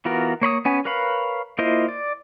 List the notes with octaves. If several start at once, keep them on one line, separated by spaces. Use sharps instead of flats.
E3 B3 F4 F#4 A#4
A#3 C#5 B5 D#6
B3 C#4 G#5
A#4 B4 C#5 F5 B5
A#3 E4 F4 C5 D#5
D5